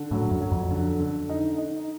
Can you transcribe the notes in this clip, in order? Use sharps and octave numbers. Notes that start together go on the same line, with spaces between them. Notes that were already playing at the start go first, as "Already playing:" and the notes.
Already playing: D3
A2 F#3
F#2
F#3
F2
D3
D3
D#4
D#4